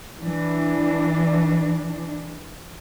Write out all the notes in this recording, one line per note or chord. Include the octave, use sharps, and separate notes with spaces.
E3 D4